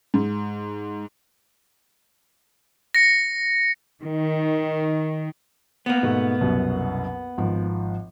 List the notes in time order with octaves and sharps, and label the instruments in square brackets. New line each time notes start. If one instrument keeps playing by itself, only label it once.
[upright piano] G#2
[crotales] A#6 C#7
[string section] D#3
[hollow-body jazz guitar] A#3 B3
[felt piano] G#2 B2 A3
C2 F#2 B2
G#1 F3